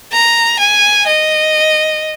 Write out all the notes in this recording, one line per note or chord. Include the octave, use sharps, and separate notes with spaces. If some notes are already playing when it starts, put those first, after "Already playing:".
A#5
G#5
D#5